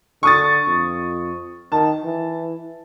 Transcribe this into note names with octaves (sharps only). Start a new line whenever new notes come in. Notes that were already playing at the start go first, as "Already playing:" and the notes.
D3 C#6 D#6 A6
F2
D#3 A5
E3